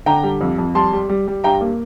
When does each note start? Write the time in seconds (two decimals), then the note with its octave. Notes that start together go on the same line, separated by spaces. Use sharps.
0.06 D3 G5 A#5
0.23 G3
0.41 F2
0.58 F2
0.75 G3 A5 C6
0.93 G3
1.09 G3
1.27 G3
1.44 G2 G5 A#5
1.61 A#3